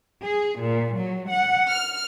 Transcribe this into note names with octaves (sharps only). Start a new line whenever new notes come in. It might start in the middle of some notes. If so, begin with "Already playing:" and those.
G#4
A#2
F#3
F#5
F6